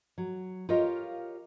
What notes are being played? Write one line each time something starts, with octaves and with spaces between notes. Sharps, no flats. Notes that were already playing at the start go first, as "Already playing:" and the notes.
F#3
F4 G4 A#4 C#5 D#5 F5